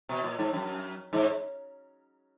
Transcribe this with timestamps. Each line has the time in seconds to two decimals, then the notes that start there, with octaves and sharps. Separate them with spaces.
0.09 B2
0.24 A#2
0.39 G#2
0.53 F#2
1.13 G#2